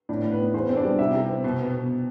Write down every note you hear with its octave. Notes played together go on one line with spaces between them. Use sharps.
A2 D4 D5
A2
B4
B3
E2 C5
C4
D4 D5
G3
C3 E4 E5
C3
C4
B2
B3
B2